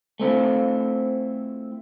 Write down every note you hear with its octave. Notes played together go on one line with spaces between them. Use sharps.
A3 C4 E4 F4